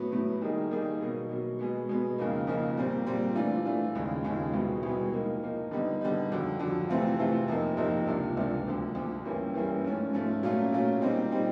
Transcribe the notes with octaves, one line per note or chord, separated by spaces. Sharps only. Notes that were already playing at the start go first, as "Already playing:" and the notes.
Already playing: A2 F#3 B3
A2 F#3 B3
D#3 G3 A#3 D#4 G#4
D#3 G3 A#3 D#4 G#4
B2 F#3 A#3
B2 F#3 A#3
B2 G#3 B3
B2 G#3 B3
F2 C#3 F3 A#3 D#4
F2 C#3 F3 A#3 D#4
A#2 G3 C4
A#2 G3 C4
E3 A3 D4 F4
E3 A3 D4 F4
D#2 C#3 F3 G#3
D#2 C#3 F3 G#3
C2 B2 G#3 B3
C2 B2 G#3 B3
F3 A#3 D#4
F3 A#3 D#4
D3 G3 B3 D#4
D3 G3 B3 D#4
F2 D3 F#3
F2 D3 F#3
C3 E3 A3 C4 F4
C3 E3 A3 C4 F4
F2 C3 F3 A#3 D#4
F2 C3 F3 A#3 D#4
C#2 C3 F3 A#3 D4
C#2 C3 F3 A#3 D4
D2 D3 F3
D2 D3 F3
G2 E3 G3 A#3 C#4
G2 E3 G3 A#3 C#4
G#2 F3 A3 C#4
G#2 F3 A3 C#4
A#2 F#3 A3 C#4 F4
A#2 F#3 A3 C#4 F4
A#2 G3 C4 D#4
A#2 G3 C4 D#4